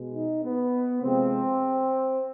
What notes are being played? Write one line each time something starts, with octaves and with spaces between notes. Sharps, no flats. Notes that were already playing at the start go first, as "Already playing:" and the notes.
Already playing: B2 G#3
D#4
B3
C3 F3 G#3 C4